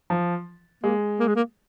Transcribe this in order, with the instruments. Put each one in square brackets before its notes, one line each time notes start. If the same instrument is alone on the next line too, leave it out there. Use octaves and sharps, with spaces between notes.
[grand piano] F3
[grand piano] G#3 [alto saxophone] A#3
[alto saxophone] A#3
G#3
A#3